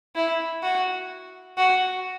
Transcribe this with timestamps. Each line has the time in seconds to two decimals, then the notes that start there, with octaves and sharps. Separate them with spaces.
0.16 E4
0.63 F#4
1.57 F#4